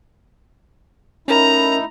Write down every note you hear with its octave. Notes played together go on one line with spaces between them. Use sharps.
A3 C#4 D#4 E4 A#4 A#5